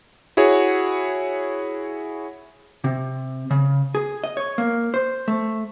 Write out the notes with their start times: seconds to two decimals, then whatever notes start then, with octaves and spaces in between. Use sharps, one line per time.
0.37 E4 F#4 G#4 C#5
2.84 C3
3.51 C#3
3.95 G#4
4.24 D#5
4.37 C#5
4.58 A#3
4.94 C5
5.28 A3